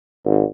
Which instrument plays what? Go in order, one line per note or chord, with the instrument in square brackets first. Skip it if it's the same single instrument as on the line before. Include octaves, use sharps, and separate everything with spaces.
[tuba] G#1